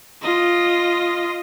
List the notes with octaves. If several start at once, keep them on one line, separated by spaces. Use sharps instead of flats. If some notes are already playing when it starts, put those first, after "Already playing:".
F4 D#5